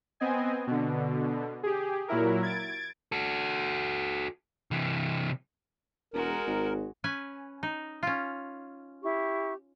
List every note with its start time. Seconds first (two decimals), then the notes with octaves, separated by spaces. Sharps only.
0.20 B3 C4 D#5 G#5
0.67 B2 D3
1.63 G4 G#4
2.08 A#2 F#3 E4 A#4
2.43 G#6 A6 D7
3.12 F#4 A4
4.71 C3 E3
6.14 E1 G#3 F#4 A#4
6.47 G#1
7.04 C#4 B4 G#5
7.63 D#4
8.03 C#4 F4
9.02 E4 G4 C#6